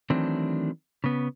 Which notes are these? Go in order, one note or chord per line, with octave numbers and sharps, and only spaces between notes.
D#3 E3 F#3 A3 C4 D4
C#3 B3